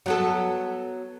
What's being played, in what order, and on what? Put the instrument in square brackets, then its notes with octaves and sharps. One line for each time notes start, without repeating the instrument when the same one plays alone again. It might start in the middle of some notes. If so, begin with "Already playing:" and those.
[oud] F#3 B3 A4